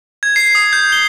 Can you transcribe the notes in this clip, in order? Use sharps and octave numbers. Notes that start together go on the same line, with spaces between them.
G#6
C7
D#6
G6
G7